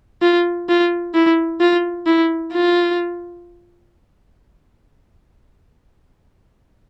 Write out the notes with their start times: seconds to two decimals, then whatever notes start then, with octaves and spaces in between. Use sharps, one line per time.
0.22 F4
0.69 F4
1.15 E4
1.60 F4
2.06 E4
2.52 F4